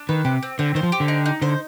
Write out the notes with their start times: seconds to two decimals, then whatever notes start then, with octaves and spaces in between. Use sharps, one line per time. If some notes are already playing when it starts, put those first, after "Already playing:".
Already playing: D4
0.09 D#3 B4
0.25 C3 G4
0.43 C4
0.59 D3 C4
0.75 D#3 C5
0.83 F3
0.92 G4
1.00 D3
1.08 D#4
1.26 D#4
1.42 D3 C5